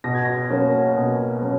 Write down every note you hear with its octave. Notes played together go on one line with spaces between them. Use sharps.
B2 A#6
G#6
A#6
F#3 A#3 C#4
B2
F#3 A#3 C#4